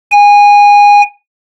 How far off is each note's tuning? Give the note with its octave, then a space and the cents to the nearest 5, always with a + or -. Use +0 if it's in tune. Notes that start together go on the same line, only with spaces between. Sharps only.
G#5 -20